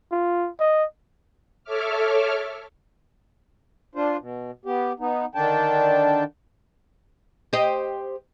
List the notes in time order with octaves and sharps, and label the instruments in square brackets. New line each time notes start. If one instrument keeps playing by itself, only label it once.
[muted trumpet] F4
D#5
[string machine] A4 C#5 E5 D6 F6
[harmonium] D4 F4 C5
B2
B3 G4
B3 D#4
D3 D#3 D4 G5 A5
[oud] G4 C5 D#5